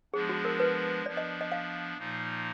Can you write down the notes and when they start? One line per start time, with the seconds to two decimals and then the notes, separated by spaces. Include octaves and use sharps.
0.14 F3 G#3 B3 D4 G#4
0.29 F#4
0.45 A#4
0.60 B4
1.06 F3 B3 D4 D5
1.17 D#5
1.41 D#5
1.52 F5
1.97 A#2 F3 A#3 D#4